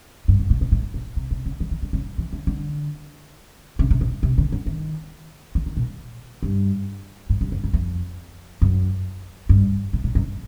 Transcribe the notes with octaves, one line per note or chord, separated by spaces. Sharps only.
G2
F#2
A#2
A2
A2
A#2
C3
C3
C#3
D#3
E3
D3
C#3
E3
D3
D3
C#3
C3
A#2
C3
D3
D3
D#3
E3
D#3
A#2
G2
G#2
G2
F2
F#2
F2
F#2
G2
A2
A#2
F#2